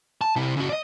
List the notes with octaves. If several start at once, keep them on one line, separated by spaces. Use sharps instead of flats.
A5
C3 E4
C#3 F#4
D5 D#5